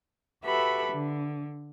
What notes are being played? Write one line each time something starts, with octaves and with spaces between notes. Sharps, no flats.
F#4 G4 A4 B4 E5 B5
D3